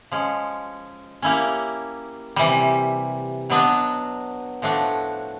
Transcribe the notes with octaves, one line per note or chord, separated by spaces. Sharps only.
F3 G#3 C#4
A#3 C#4 E4 G4
C3 E3 G3
B2 F#3 B3 D4
A2 F3 A3 D4 F#4